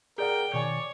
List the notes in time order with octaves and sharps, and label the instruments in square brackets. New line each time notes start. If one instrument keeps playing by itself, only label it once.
[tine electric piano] G#4 D5 F#5 [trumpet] A#4 [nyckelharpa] G5
[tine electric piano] B2 D#3 G#5 [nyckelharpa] C#5 [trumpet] D5